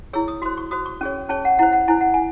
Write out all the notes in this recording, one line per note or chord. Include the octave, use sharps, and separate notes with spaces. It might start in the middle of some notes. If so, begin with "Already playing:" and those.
E4 G#4 C#5 E6
D#6
F#4 C5 C6
C#6
F#4 C5 D#6
C#6
C#4 G#4 C#5
C#4 G#4 C#5 A5
F#5
E4 C5 F#5
F#5
E4 C5 G#5
F#5
G#5